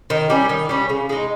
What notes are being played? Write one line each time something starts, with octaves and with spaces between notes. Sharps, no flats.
D#3
G3 C#4
D#3
G3 C#4
C#3
G#3 D#4